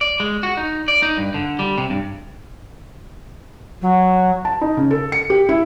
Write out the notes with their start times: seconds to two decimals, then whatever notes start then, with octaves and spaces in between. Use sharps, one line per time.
0.01 D5
0.20 G#3
0.43 F#4
0.57 D#4
0.88 D5
1.03 D#4
1.17 G2
1.34 D3
1.59 G3
1.78 C3
1.90 G2
3.81 F#3
4.45 A5
4.61 D#4
4.77 C#3
4.91 A4
5.12 C#7
5.30 G4
5.49 E4